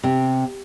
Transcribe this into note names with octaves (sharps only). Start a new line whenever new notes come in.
C3